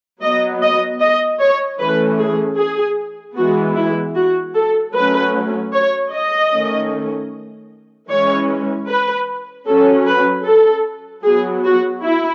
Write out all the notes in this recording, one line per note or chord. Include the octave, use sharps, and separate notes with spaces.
F#3 B3 D#5
D#5
D#5
C#5
E3 A3 C#4 B4
G#4
G#4
E3 G#3 B3 F#4
E4
F#4
A4
F#3 A3 C#4 B4
C#5
D#5
D#3 A3 C#4
E3 G#3 C#4 C#5
B4
F#3 C#4 A4
B4
A4
F#3 B3 G#4
F#4
E4